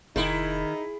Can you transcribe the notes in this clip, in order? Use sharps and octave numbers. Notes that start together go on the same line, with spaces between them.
F1 D#3 D#4 E4 G#4